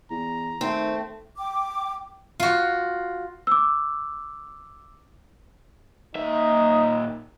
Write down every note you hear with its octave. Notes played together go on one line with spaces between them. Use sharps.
E2 A#5
D#3 A3 C4
G5 D6
F4 F#4
D6 E6
A#2 D#4 E5